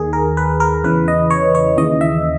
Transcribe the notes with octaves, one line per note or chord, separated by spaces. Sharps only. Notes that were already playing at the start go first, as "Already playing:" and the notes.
Already playing: D#2 D#3 G#4
A#4
B4
A#4
E2 C#3 E3 B4
D#5
C#5
C#5
D#2 C#3 E3 D#5
E5